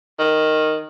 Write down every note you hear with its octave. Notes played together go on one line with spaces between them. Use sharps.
D#3